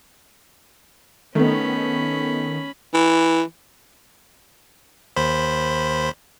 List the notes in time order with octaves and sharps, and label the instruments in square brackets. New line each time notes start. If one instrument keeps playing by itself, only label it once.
[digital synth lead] D#3 [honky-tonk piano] A3 B3 [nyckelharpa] C#4 B5
[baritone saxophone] E3
[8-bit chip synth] D#2 C5 B5